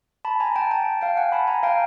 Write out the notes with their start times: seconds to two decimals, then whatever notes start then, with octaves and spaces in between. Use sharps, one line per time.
0.25 A5 B5
0.40 G#5 A#5
0.56 G5 A5
0.71 G5 A5
1.01 F5 G5
1.17 F#5 G#5
1.32 A5 B5
1.48 G#5 A#5
1.63 F5 G5